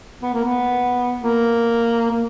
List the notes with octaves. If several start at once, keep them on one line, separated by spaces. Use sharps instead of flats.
B3
A#3
B3
A#3
A#3